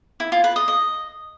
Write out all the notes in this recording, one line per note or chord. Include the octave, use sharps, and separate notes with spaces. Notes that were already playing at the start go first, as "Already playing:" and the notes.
E4
F4
B4
D#5
D#5